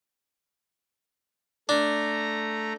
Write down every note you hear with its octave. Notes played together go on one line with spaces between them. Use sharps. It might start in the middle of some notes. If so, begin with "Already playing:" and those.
A3 D4 A#5